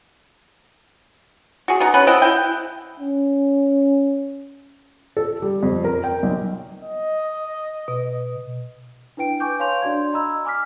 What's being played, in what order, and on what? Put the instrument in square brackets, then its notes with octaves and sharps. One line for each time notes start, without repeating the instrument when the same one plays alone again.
[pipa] F#4 G#4
B3 D#4
B3 C#4 B4
C4 E4 D#5 F#5
E4 G5
[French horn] C#4
[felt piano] A4
G3
F2
A#4
G5
B1
[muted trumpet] D#5
[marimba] B2
[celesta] D4 E4 B4 G5 D7
B4 G#5 C#6 D6 G6
C#5 F5 A5 C6 G6 F7
D4 F#4 D5 C6 G#6
D#5 A#5 B5 E6
G#5 D6 F6 B6